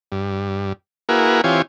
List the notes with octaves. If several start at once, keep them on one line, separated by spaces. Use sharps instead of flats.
G2
A#3 E4 F#4 G#4 A#4 B4
E3 C4 F4 G4 C#5 G#5